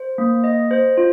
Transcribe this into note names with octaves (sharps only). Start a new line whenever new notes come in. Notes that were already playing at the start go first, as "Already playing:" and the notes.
Already playing: C5
A#3
D#5
C5
F4